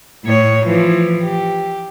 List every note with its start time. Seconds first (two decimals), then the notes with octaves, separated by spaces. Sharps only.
0.24 A2 C#5
0.66 E3 F3
1.23 G4